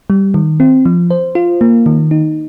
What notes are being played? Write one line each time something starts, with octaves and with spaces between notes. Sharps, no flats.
G3
D#3
C4
F3
C5
F4
A#3
D#3
D#4